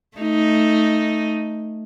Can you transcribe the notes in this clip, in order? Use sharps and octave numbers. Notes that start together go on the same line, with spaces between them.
A3 D#4